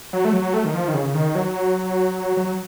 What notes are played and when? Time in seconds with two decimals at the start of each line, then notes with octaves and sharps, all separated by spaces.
0.13 F#3
0.25 A3
0.33 F#3
0.54 A3
0.65 D#3
0.74 F3
0.88 D#3
0.94 C#3
1.14 D#3
1.35 F#3
2.37 F#3